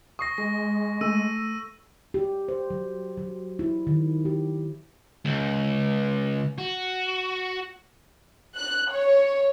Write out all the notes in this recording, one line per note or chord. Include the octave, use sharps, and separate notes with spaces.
C#6 D#6 A#6 C7
G#3 A#6
A3 E6 D#7
G4
C5
F#3
F#3
E4
D#3
G4
C#2
F#4
F#6
C#5